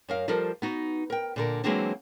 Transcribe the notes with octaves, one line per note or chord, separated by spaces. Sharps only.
F#2 A#4 F5
F3 G3 A4 A#4 C5
B3 D#4 F#4
A#4 G5
A#2 D3 A#4
E3 F#3 G#3 A#3 C4 D4